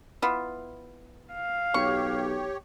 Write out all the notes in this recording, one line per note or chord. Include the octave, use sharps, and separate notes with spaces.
B3 E4 F4
F5
B1 G4 C#5 C#6